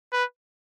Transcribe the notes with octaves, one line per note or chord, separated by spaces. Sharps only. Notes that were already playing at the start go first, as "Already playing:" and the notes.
B4